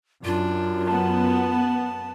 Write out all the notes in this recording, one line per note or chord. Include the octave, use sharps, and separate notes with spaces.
F#2 D4 F4
B3 A5